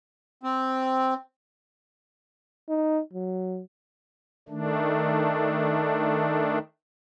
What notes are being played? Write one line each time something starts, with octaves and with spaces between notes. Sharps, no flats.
C4
D#4
F#3
D#3 A3 D4